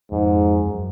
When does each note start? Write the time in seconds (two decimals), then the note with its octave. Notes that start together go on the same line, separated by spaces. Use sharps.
0.12 F2 G#2
0.66 F#2